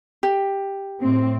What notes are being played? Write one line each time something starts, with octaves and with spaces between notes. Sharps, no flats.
G4
A2 C4